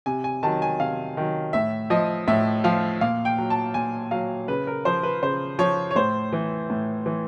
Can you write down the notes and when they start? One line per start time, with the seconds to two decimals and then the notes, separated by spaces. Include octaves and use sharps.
0.06 C3 G#5
0.24 G#5
0.43 D#3 F#3 A5
0.62 G#5
0.80 C3 F5
1.17 D#3 F#3
1.53 A2 E5
1.90 F3 D#5
2.28 A2 E5
2.64 F3 F5
3.01 A#2 F5
3.25 G5
3.38 F#3
3.50 A5
3.74 A#2 G#5
4.11 F#3 F5
4.48 C#3 B4
4.67 A#4
4.85 F3 C5
5.03 B4
5.22 C#3 C5
5.59 F3 C#5
5.91 C#5
5.96 A2 C5
6.33 E3
6.70 A2
7.06 E3